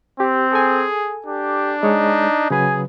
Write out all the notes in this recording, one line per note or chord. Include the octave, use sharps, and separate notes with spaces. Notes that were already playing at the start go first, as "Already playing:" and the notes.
C4 G4
G#4 A4 G#5
D4 G4
G#3 D#4 C#5
C#3 F#3 G#4 B4 G#5